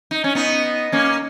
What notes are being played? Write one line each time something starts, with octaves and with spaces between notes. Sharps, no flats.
D#4
C#4
B3 D#4
A#3 C#4